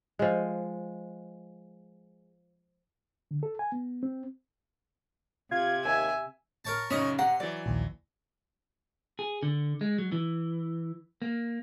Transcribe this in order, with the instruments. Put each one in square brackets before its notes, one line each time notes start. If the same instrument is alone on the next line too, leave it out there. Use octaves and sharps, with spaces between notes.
[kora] F3 G#3
[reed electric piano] D3
A4
G#5
B3
C4
[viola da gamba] C3 [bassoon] F4 [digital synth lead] G#6
[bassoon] D#2 [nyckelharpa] E5 G#5
[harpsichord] A#4 C#5 A5
[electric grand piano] F#2 C#3 [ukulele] C#4 D#4 [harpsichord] C#5 D#5
[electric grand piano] C3 A#5 [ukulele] F#5 [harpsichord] C6
[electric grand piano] E3 F#3 [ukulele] D5
[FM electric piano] A#1 D#2
[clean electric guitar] G#4
D3
G#3
F#3
E3
A#3